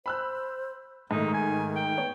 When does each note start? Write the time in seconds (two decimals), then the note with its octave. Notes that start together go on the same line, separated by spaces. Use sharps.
0.06 C5 B5 E6 F#6
1.11 G#2 D#3 A3 D#4
1.34 G#5
1.76 G5
1.97 B3 C#5